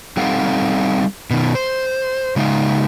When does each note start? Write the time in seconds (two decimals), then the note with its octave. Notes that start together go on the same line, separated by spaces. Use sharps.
0.17 G3 C4 D#4 A4 F5 F#5
1.30 B2 D#3
1.55 C5
2.36 C#3 G#3 D#4 F5